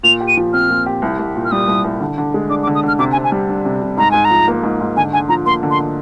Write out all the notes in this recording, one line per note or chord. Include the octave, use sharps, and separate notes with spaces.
A#2 F7
G4
D#7
F3
C4 F6
A#2
G4
C2
C2
A#2
F6
G3 D#6
C2
C2
D3
D3
G#3
D4 D6
D6
D3
D#6
D3 F6
C3 D6
G#5
C3
G#5
G3
D4
C3
C3
G#2 A#5
G#2 G#5
A#5
F3
A#3
G#2
G#2
D3 G#5
D3 G#5
F3 A#5
A#3 C6
D3
C6
D3